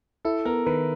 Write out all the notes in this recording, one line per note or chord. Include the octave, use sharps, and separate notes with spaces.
E4 A4
B3 A#4
D#3 B4